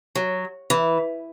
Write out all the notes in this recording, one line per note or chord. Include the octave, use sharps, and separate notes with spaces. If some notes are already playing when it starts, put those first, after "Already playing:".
F#3
E3